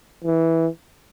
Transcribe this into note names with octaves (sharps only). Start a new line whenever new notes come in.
E3